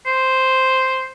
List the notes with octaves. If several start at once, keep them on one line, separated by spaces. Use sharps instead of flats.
C5